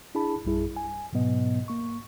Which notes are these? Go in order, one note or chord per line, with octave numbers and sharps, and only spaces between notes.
D4 E4 G#4 A5 B5
A#1 F#2 G3 E4 G#4
G#5
G#2 B2 F#3 B3 D#5
A#3 C#6